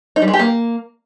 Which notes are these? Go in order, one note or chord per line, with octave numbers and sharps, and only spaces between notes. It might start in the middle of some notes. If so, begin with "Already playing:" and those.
D#4
G3
G#3
G4
A#3